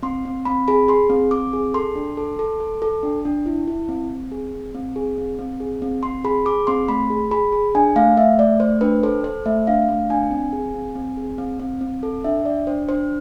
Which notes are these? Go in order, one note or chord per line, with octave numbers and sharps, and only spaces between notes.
C4 C6
C4
C4 B5
G#4 B5
G#4 C6
C4
C4 D6
G#4
A4 C6
D4
A4
A4
A4
A4
D4
D4
E4
E4
C4
C4
G#4
C4
C4
G#4
C4
C4
G#4
C4
C4 C6
G#4 B5
G#4 D6
C4 C6
A3 B5
G#4
G#4 B5
G#4
D4 G#5
A3 F5
A3 E5
A3 D5
A3 C5
D4 B4
A4 C5
A4 C5
A3 E5
D4 F5
A3 F5
D4 G#5
C4
G#4
C4
C4
G#4
C4
C4
C4
A4
D4 E5
D4 D5
D4 C5
D4 C5